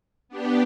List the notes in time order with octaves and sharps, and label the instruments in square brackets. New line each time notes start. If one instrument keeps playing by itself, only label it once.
[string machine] B3 D4 G4